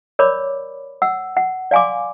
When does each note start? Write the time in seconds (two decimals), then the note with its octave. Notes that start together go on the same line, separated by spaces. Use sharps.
0.19 A#4 C#5 D5 B5 D6
1.02 F#5 E6
1.37 F#5
1.71 D5 F5 G#5 C6 D6